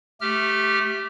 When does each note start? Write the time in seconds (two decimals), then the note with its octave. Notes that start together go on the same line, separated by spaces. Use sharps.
0.21 A3 G4 F6